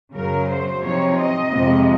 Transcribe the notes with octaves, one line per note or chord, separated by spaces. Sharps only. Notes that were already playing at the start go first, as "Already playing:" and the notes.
F#2 C#3 F#3 A#4
C5
C3 F3 C4 D#4 C#5
D#5
F2 C3 F3 G#3